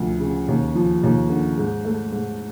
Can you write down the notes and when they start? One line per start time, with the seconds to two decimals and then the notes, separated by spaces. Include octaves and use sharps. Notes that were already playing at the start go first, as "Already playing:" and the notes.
Already playing: D2 F3
0.20 C#3
0.48 D#2
0.75 F3
1.03 D#2
1.29 D3
1.58 G#2
1.85 A3
2.12 G#2